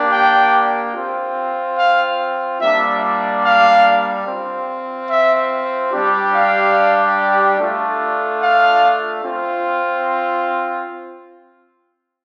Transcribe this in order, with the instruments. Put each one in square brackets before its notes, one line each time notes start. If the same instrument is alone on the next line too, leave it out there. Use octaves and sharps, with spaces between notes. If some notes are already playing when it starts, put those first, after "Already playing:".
Already playing: [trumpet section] A#3 D4 G4
G5
C4 F4
F5
G3 A#3 D4 E5
F5
C4 F4
E5
G3 D4 G4
F5
A3 D4 F4
F5
C4 F4